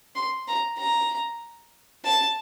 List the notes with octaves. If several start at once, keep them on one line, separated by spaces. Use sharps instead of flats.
C6
A#5
A#5
A5